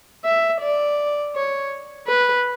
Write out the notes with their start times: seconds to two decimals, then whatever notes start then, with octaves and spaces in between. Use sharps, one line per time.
0.25 E5
0.61 D5
1.35 C#5
2.07 B4